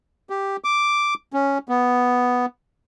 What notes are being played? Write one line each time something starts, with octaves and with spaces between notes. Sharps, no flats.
G4
D6
C#4
B3